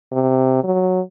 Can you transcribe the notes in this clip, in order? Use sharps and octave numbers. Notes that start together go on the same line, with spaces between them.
C3
F#3